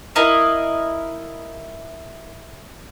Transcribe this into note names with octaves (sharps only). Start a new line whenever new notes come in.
E4 A#4 D#5 F5